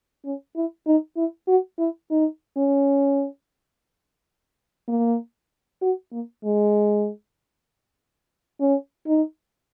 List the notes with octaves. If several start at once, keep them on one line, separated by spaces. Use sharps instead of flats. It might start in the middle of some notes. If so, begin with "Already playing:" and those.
C#4
E4
D#4
E4
F#4
E4
D#4
C#4
A#3
F#4
A#3
G#3
C#4
D#4